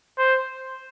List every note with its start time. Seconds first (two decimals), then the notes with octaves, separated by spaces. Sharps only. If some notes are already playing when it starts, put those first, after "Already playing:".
0.18 C5